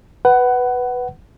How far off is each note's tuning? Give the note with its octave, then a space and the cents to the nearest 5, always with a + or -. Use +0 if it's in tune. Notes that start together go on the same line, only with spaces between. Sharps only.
B4 +0 F#5 +15